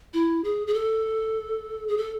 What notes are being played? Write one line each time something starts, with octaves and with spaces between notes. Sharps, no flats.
E4
G#4
G#4
A4
G#4
A4